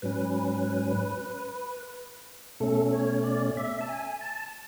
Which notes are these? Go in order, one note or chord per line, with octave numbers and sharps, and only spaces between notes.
G#2 F#3 C#4 B4
B2 A3 C#4 A4
C#5
D5
E5
A5
G#5
A5